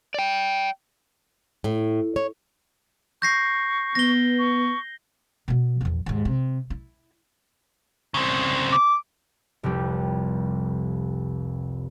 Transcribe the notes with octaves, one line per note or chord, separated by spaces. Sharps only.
D5 G5
A2
C#5
C#6 G6 A#6 C7
B3 A#6 G7
C#6
B2 B3
A#1 E2
D#2 G#2
C3
E4
C#3 C4
D6
F1 C2 F2 G4 G6